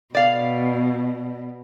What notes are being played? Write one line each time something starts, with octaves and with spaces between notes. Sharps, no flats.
B2 D5 F5